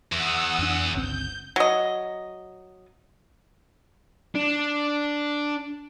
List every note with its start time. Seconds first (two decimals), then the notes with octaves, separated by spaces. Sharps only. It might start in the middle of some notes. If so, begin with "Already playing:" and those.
0.12 E2 F#5 D#6 E6
0.59 F2 D4
0.94 G1 C#2 C4 G6
1.56 F#3 D#5
4.35 D4